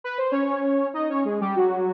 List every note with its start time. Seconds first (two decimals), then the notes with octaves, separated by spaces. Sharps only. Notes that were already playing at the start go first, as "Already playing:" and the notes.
0.04 B4
0.18 C5
0.31 C#4 C#5
0.94 D#4 D#5
1.09 C#4 C#5
1.25 G#3 G#4
1.41 G3 G4
1.56 F#3 F#4